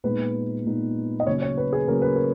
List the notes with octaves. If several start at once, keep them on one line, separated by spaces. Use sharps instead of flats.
A#2 G#3 B3 D#4 B4
A#2 G#3 B3 D#4
D#5
C#3 F#3 A#3 C#4 C#5
C#5
B4
G#4
C#3 F#3 A#3 C#4 A#4
B4
A#4